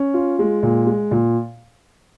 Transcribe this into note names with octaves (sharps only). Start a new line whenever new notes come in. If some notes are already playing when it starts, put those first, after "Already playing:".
Already playing: C#4
F4
G#3
A#2
G#3
A#2